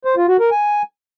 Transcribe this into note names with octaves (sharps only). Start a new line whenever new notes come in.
C5
F4
F#4
A#4
G#5